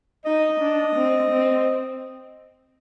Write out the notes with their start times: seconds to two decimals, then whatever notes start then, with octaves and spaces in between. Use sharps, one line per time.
0.25 D#4 D#5
0.60 D4
0.95 C4
1.30 C4